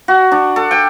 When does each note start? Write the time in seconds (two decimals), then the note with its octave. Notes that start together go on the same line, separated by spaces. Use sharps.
0.08 F#4
0.32 D4
0.56 A4
0.71 G5